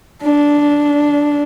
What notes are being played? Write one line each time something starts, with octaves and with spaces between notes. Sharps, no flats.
D4